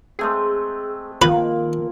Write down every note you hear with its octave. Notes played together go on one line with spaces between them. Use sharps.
G#3 A3 C4 G#4
D#3 A#3 F4 B4